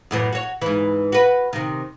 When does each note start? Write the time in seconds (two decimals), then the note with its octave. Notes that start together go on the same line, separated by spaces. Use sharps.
0.11 F#2 A2 E3
0.33 F#4 C#5
0.62 G#2 E3
1.12 F#4 B4
1.53 C3 D#3